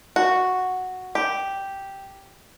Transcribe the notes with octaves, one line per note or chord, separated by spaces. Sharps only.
F#4
G4